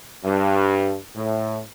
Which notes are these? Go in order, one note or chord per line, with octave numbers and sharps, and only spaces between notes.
G2
A2